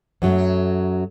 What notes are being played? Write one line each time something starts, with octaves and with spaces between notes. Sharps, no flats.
F#2 F#3 A3